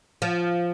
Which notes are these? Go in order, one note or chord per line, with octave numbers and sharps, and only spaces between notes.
F3